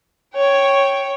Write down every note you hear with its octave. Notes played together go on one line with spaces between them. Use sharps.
C#5 G5